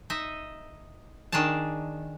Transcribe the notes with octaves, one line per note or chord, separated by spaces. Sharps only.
D#4 D#5 E5
D#3 D4 G#4 C#5 A5